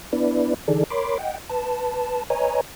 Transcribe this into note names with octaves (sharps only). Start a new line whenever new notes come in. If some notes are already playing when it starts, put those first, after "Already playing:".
B3 D4 E4 B4 D5
D3 E3 D#4 G#4 A4 D5
A#4 C#5 B5 C6 D6
D#5 F#5 G5
B4 A5
B4 C#5 D#5 G#5 A#5